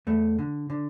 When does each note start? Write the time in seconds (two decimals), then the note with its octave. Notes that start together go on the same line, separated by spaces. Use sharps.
0.07 E2 A3
0.39 D3
0.70 D3